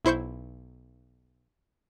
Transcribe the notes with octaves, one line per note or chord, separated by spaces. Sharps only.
B1 E4 C5 C#6 G6